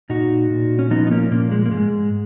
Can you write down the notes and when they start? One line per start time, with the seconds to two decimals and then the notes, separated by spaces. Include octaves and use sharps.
0.09 A#2 D#4 F#4
0.50 A#2
0.79 C#4
0.91 F3 B3 D#4
1.07 D#4
1.11 A#3 C#4
1.31 A#2 A#3
1.51 G#3
1.66 A#3
1.71 G#2 G#3